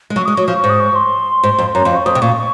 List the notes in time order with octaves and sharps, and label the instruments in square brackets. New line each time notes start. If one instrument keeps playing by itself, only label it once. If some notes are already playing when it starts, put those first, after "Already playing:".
[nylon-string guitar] G#3
[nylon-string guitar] F#3 [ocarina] C#6
[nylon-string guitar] G#3 [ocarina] D#6
[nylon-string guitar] F#3 [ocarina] C#6
[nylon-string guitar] F3
G#2
[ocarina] D#6
C#6
C6
[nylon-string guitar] G#2
F2
[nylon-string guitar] F#2 [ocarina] A#5
[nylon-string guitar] F2 [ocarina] C6
[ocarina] C#6
[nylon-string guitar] F2 [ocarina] D#6
[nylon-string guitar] C3
[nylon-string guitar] A#2 [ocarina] C#6
[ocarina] C#6